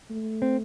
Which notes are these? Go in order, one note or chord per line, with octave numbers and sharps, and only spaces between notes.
A3
C4